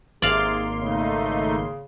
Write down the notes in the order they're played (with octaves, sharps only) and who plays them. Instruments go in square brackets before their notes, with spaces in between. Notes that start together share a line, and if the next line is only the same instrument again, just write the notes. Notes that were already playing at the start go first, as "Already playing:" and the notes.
[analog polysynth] G#1 A#3 C6 [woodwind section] C3 G#4 [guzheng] D5 F5
[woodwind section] C#3 [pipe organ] A3 D#4